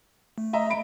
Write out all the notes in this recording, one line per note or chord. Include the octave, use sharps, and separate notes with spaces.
A3
D#5 E5 A#5
B5 D7